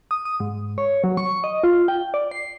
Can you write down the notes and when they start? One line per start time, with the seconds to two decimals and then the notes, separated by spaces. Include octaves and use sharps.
0.11 D#6
0.25 D#6
0.40 G#2
0.78 C#5
1.04 F#3
1.17 C#6
1.44 D#5
1.64 F4
1.88 G5
2.14 D5
2.31 C7